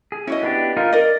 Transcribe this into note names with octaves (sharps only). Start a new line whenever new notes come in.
G#4
C#4 E4 F#4 D#5
B3 D4 G4
D#4 F4 A#4
A#4 D5 D#5